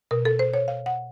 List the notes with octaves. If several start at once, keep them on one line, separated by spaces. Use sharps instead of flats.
B2 A#4
A4
C5
C#5
F5
F#5